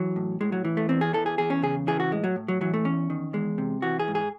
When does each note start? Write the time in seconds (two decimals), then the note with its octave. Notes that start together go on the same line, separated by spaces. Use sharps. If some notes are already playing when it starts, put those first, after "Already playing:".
Already playing: E3 F#3
0.16 A2
0.41 A2 G#3
0.52 F#3
0.65 E3
0.77 A3
0.89 E2 C4
1.01 G#4
1.13 E3 A4
1.26 G#4
1.38 E2 G#4
1.50 C#4
1.62 C#3 G#4
1.87 E3 G#4
2.00 F#4
2.11 A2 G#3
2.24 F#3
2.36 A2
2.48 F#3
2.61 E3 F#3
2.74 A3
2.85 E2 C#4
3.10 D#3
3.33 E2 G#3
3.58 C3
3.82 E3 F#4
4.00 G#4
4.08 G#2
4.15 G#4